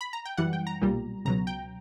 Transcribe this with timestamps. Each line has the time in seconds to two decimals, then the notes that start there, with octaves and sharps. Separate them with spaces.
0.01 B5
0.13 A#5
0.25 G5
0.37 F#2 E3 G3 F#5
0.53 G5
0.67 A#5
0.82 B1 A#2 G3
1.25 C#2 B2 F#3 A#5
1.47 G5